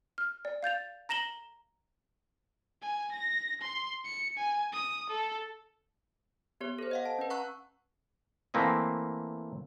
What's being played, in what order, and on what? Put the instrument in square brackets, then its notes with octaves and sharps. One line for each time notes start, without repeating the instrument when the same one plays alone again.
[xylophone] F6
D5
F5 G6 A6 F7
A#5 A#6 E7 F#7 G7
[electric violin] G#5
A#6
C6
C#7
G#5
D#6
A4
[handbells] B3 G4 C#5
A4 C5
D#5 F5 F#5
A5
C#4 B4
F#5 A#5 C#6 E6 F#6
[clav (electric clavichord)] E3 A3 A#3 C4 E4 D#5